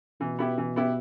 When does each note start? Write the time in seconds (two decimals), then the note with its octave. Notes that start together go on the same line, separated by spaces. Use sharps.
0.21 B2 E3
0.39 B3 E4 G4
0.58 E3
0.76 B3 E4 G4